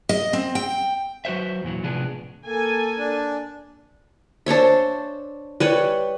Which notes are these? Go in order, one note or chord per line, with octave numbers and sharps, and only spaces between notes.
D#5
C4
G5
F#3 F#4 B4 C5 E5
E2 A#2 E3 F#3
A2 C3 F3 B3 D4 G#4
A#3 A4 G#5
D4
D4 C5 C#5 E5
G3 B4 C#5